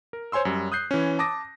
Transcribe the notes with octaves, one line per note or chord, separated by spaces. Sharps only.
A#4
C5 C#5 G#5 C6 E6
F#2 G3
D#6 F#6 G6 C7
E3 C#4
A5 D6 D#6 A#6